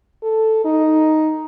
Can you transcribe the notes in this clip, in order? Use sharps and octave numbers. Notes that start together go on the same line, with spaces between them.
A4
D#4